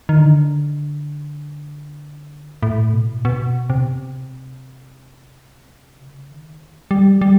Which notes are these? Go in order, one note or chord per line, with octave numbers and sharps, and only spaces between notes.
D#3
D3
A2
B2
B2
C3
C#3
D#3
G3
G3